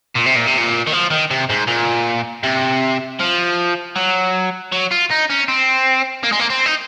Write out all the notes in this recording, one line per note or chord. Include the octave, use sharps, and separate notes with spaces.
A#2
C3
A#2
C3
A#2
D#3
F3
D#3
C3
G#2
A#2
C3
F3
F#3
F#3
F4
D#4
C#4
C4
A#3
G#3
A#3
C4
D#4